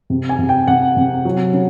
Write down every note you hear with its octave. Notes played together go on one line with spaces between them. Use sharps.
C3
G#5
C3
G5
C3 F#5
C3
F#3
C#3